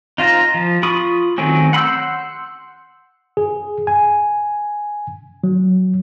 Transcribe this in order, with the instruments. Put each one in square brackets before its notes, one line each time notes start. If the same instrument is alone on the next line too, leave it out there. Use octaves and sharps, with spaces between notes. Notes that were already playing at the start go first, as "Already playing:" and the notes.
[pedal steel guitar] D#4 F4 C5 A#5
F3
F4 B5 C#6 D#6
D#3 F#3 A3 C4 C#4
F#5 B5 C6 E6 G6
[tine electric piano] G#4
G#5
F#3